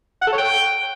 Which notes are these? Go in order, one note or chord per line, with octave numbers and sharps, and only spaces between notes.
F#5
A4
C#5
G5